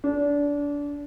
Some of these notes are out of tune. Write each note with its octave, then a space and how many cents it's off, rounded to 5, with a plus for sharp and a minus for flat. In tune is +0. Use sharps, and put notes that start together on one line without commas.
D4 -25